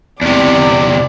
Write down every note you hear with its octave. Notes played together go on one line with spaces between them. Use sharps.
E2 C3 D5